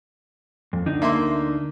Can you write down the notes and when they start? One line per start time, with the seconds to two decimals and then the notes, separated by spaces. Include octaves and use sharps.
0.73 F2
0.86 D2 D4 D#4
1.02 A#3 E5 C6